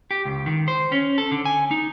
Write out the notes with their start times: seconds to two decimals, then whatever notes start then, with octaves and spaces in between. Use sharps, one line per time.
0.11 G4
0.25 C#2
0.46 D#3
0.68 C5
0.92 C#4
1.18 A4
1.32 D3
1.45 G#5
1.71 D#4